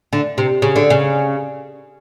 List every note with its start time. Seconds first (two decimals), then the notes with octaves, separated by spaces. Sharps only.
0.13 D3
0.38 C3
0.62 C#3
0.76 D3
0.90 C#3